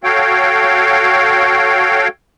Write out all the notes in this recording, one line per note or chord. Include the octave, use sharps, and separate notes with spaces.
F#4 A4 C#5 F5 G5